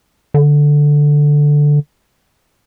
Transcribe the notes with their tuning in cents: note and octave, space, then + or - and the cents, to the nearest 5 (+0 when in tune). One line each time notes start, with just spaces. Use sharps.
D3 +0